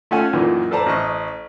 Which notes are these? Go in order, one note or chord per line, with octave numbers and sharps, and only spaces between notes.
A3 C#4 F4 A4 F#5 G#5
F#2 A#2 D#3 E3
A4 B4 C5 D5 A5 A#5
A1 C5 D#5 C#6 D#6